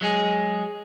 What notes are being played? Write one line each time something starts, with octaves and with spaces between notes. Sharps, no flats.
F#3 G#3 G#4